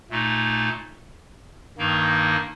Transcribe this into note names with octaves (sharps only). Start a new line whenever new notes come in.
A#2 A3 D#4
G2 D#3 A#3 D#4